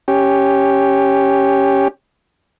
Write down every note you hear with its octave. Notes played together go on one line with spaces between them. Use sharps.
C#4 G4